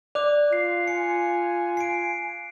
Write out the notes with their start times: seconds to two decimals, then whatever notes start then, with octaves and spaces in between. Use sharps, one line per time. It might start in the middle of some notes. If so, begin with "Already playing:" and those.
0.15 D5 D6 F#6 F7
0.53 F4 C7
0.87 G#5 C#7
1.77 C7 D7